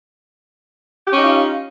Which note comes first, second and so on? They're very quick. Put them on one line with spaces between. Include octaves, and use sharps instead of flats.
G4 C#4 D#4 F4